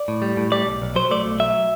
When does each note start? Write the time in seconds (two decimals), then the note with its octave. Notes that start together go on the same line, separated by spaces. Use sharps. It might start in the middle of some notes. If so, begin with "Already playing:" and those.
Already playing: D5
0.08 A2
0.22 G3
0.37 A2
0.52 G3 D5
0.67 B1
0.82 B1
0.96 F#3 C5
1.11 A3 D5
1.26 B1
1.40 F#3 E5